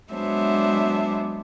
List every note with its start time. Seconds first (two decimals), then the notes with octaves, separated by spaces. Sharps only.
0.13 F#3 G#3 B3 D4 C5 E5